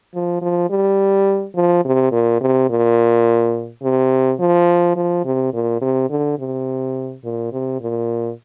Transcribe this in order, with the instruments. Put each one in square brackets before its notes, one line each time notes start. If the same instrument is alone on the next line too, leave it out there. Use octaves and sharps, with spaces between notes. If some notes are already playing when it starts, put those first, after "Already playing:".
[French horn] F3
F3
G3
F3
C3
A#2
C3
A#2
C3
F3
F3
C3
A#2
C3
D3
C3
A#2
C3
A#2